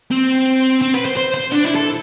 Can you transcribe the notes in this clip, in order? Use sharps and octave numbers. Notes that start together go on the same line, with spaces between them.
C4
C4
B4
C5
C5
C5
D4
E4
A4